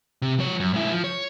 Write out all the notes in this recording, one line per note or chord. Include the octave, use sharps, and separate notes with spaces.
C3
F3 C#5
F#2
G#2 E4
F3
C#5